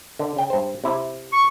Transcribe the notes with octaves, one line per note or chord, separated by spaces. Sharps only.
D3
C#3 G5
G2 C5
C3 E4
C#6